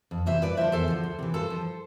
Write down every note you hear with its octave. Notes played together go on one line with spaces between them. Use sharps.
F2
C3 E3 C5 E5
G2 B4 D5
D3 F3 C5 E5
E2 A4 C5
D3 F3
D2
C3 E3
G2 A4 C5
F3